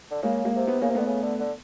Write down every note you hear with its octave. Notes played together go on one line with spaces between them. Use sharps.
D3
C#3 G#3 A#3
G#3 A#3
C3
B3
C#3 A#3
C3
D3 A3 B3
C#3
D3
D3